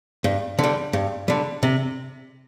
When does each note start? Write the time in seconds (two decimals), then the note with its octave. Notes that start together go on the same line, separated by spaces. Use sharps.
0.24 G2
0.59 D3 G3
0.93 G2
1.28 D3 G3
1.63 C3